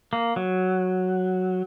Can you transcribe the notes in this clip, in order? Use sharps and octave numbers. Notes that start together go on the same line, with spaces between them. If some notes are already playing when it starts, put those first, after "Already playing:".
A#3
F#3